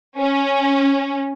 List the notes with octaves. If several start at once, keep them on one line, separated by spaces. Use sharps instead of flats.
C#4